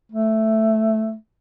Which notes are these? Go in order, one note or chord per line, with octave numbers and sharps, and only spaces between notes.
A3